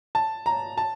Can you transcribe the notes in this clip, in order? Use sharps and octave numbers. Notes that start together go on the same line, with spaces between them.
A5
A#5
A5